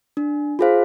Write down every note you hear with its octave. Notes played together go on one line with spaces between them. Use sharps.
D4
F4 G#4 C5 F5